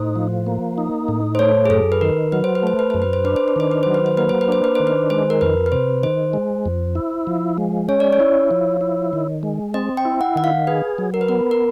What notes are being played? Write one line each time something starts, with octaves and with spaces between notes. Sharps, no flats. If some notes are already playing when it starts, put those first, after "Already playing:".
Already playing: A2 D#4 C5
F3
A#3
D#4
A2
C5
A3 C#5
G#4
F#2 A4
B4
D#3 A#4
F#3 B4
C5
B4
A3 C5
B4
F#2 C5
B4
C5
D4 B4
C5
B4
D#3 C5
B4
F#3 C5
B4
C5
A#3 B4
C5
B4
D4 C5
B4
D#3 C5
B4
G#3 C5
A#4
F2 B4
B4
C3 C5
D#3 C5
G#3
F2
E4
F3
G#3
C#4 C#5
D5
C#5
E4
F3
E4
D#3
G#3
C4 D#5
G5
E4
F#5
D#3 F#5
F5
G#4 B4
F#3
A#4
B4
B3 A#4
A#4